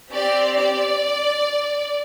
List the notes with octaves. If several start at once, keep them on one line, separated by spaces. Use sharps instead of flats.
C4 G4 D5
D5